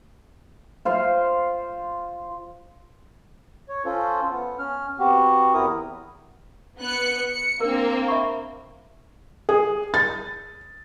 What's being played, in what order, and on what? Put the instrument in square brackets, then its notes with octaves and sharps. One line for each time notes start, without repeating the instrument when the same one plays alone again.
[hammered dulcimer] F4 C5 F5
[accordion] C#5
C#4 F4 A4 C5
B3
C#4 F6
B3 C4 F#4 G4
E2 B3 C4 E4 A#4 D#6
[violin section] B3 F#6 C#7
C#7
[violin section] A#3 C4 [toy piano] D4 A#4
[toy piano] E5 B5 C#6
[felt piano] G#4
A6